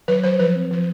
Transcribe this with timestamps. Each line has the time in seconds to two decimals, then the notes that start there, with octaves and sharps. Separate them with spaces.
0.08 F#3 B4
0.23 F#3 C5
0.39 F3 B4
0.55 C4
0.71 F3